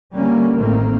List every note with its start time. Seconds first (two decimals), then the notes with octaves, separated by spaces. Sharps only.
0.14 D3 G3 A#3 C#4
0.55 A1 D#3 A3 A#3 C4